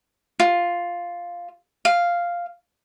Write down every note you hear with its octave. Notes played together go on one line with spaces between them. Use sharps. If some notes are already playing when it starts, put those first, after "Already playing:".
F4
F5